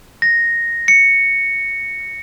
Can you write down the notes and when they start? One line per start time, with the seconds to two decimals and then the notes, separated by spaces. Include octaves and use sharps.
0.22 A#6
0.88 C#7